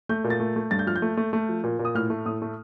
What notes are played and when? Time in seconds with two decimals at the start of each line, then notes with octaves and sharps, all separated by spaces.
0.09 A3 G6
0.24 A#2
0.30 A6
0.40 A3
0.56 A3
0.71 G2 A6
0.79 G6
0.87 F3 F6
0.96 G6
1.02 A3
1.17 A3
1.33 A3
1.49 F3
1.64 A#2
1.79 A#2
1.85 D#6
1.95 A2 F6
2.10 A3
2.26 A2 D#6
2.42 A3